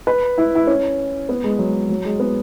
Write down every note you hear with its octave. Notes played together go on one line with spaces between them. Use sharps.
B4
E4
E4
C#4
B3
G#3
F#3
F#3
G#3
B3